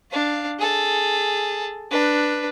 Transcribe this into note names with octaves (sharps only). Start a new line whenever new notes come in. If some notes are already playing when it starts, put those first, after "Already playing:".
D4 F5
G#4 A4
D4 B4